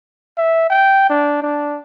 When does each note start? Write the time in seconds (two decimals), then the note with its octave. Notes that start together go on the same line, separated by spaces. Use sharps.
0.38 E5
0.70 G5
1.10 D4
1.42 D4